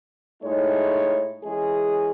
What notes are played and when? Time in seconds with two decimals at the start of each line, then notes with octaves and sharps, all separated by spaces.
0.43 A2 G#3 D#4 G#4 C#5
1.44 E3 G#3 C#4 G#4